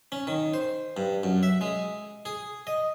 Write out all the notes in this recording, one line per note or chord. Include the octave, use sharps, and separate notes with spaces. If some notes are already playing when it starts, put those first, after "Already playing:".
C#4
D#3
C5
G2
F#2
E5
G#3
G#4
D#5